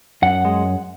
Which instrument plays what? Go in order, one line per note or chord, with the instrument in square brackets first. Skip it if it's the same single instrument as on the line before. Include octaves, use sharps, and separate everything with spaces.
[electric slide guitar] F#2 F#5
G#3